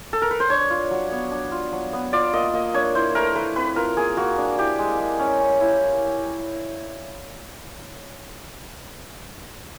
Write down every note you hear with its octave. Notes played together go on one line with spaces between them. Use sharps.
A4
A#4
B4
C5
D4 C#5
F4
F#3
B3
D4
F4
F#3
B3
F4 D5
A#3 D#5
A#3 D#5
D4 C#5
E4 C5
A3 A#4
A3 B4
C4 B4
F4 A#4
A#3 G#4
A#3 F#4
D4
E4 G4
G#3
G#3
C#4
C#4
E4